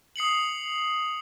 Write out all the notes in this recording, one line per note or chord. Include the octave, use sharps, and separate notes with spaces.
D#6 C7 C#7 F#7